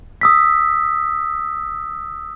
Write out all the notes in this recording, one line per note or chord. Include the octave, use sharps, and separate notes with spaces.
D#6 E6 B6